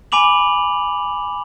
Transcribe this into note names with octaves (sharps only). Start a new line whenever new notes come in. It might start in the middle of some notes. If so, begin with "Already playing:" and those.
G#5 B5 D6 F7 F#7